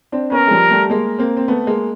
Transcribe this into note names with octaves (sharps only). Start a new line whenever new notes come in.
C4 D4
B3 C#4 A#4
G#3
F3 G3
G3 A3
G#3 A#3
A#3 C4
C4
A3 B3
G#3 A#3